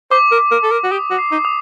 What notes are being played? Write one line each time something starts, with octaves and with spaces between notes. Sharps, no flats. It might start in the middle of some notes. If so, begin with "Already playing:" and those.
C5 D6
A#4
D6
A#4
A4 D6
A#4
F#4
G4 D#6
F#4
C7
D#4
D#6